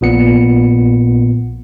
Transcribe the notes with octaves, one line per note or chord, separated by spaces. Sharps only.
A#1 A#2 B3 C#7